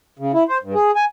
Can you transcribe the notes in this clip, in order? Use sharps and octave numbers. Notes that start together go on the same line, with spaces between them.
C#3
E4
C5
G2
G#4
G#5